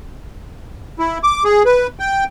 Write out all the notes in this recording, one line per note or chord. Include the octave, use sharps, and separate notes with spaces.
E4
D6
G#4
B4
G5